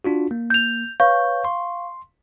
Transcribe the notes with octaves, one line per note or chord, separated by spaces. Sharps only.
D4 F4 F#4
A#3
G6 F7
B4 C#5 F5 C#6 G6
C6